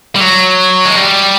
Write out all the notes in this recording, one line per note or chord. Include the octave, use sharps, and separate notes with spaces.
G3
F#3
G#3
G3